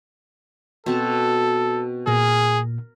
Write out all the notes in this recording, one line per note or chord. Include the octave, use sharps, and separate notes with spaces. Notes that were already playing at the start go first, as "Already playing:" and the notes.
B2 C4 A4 A5
A#2 G#4 A#4